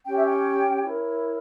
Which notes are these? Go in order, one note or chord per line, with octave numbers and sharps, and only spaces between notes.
C#4 G4 C#5 G5
E5
G5
E4 A#4 C#5